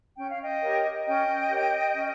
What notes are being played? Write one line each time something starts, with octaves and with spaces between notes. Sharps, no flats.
C#4 G5
F5
D#5 G5
G4 A#4 C#5
C#4 D#5 G5
G4 A#4 C#5
C#4